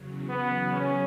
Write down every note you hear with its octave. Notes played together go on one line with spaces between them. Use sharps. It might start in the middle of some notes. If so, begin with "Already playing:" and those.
Already playing: E2 C#3 F#3
B3
C#4